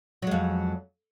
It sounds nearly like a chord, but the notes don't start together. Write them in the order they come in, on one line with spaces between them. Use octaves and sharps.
F#3 G#3 F2